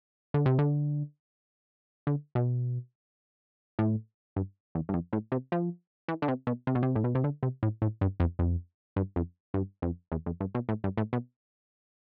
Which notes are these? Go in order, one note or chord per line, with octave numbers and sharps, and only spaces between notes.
D3
C3
D3
D3
B2
A2
G2
E2
G2
F2
A2
C3
F3
E3
D3
C3
B2
C3
B2
C3
A2
B2
C3
D3
C3
A2
A2
G2
F2
F2
G2
F2
G2
F2
E2
F2
G2
B2
A2
G2
A2
B2